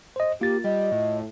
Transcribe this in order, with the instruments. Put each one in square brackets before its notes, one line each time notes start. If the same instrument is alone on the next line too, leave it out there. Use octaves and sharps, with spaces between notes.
[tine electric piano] C5 D#5
[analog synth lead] A#3 [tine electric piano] F4 A6 [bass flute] G4
[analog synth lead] G3 [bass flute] D#5
[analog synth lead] A2